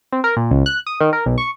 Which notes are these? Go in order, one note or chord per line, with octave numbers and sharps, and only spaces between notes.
C4
A#4
A#2
C#2
F#6
D#6
D#3
A#4
B1
C#6